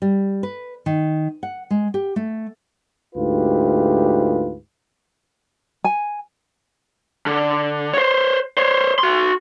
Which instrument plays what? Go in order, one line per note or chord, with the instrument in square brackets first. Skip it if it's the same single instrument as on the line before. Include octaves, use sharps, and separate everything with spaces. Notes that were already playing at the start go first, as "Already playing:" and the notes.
[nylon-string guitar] G3
B4
D#3
F#5
G#3
G4
A3
[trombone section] D2 G#2 F4 G4 B4
[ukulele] G#5
[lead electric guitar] D3
C5 C#5
C5 C#5
F#4 C6